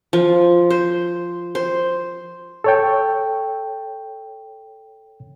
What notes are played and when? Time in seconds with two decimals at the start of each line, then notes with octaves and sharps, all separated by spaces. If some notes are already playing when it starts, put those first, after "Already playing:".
0.13 F3
0.70 C5
1.55 C5
2.64 A4 C#5 G5